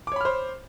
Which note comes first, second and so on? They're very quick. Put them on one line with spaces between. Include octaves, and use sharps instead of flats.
D6 C#5 B5 F6 C5